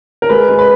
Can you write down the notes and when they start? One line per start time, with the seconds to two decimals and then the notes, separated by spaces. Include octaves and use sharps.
0.22 A#4
0.29 G#3 B4
0.49 G#3
0.59 B4